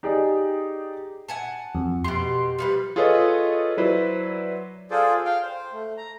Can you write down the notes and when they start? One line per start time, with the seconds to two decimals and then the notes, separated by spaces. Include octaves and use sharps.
0.03 D#4 G4 G#4 D5
1.28 F#5 G#5 A5
1.75 F2
2.04 B2 G4 C6
2.58 F3 G3 B4
2.96 F4 G#4 A4 B4 C#5 D#5
3.77 F#3 E4 B4 C5 D5
4.91 F4 G#4 A4 C5 D5
5.25 F5 G5
5.43 C5
5.72 A3
5.97 A#5